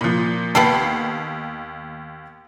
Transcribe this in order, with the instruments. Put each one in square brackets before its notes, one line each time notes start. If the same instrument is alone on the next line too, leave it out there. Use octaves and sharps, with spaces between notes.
[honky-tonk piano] A#2 F3
[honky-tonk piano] D#2 C7 C#7 [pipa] B3 G4 A4